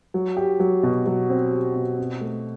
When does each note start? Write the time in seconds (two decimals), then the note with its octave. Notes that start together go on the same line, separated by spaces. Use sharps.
0.14 F#3
0.37 G4
0.60 F#3
0.83 B2
1.06 F#3
1.30 C4
1.52 G4
1.76 B2
1.98 C4
2.21 A3